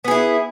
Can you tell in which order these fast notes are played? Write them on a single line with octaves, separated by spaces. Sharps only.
B3 G#4 E4